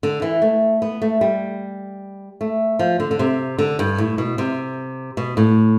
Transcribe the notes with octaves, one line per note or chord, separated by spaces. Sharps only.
D3
E3
A3
B3
A3
G3
A3
F3
D3
D3
C3
D3
G2
A2
B2
C3
B2
A2